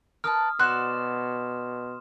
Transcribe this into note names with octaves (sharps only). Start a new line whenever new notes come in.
A#4 B4 A5 D#6 F6
B2 F#4 C5 D5 C6 F#6 E7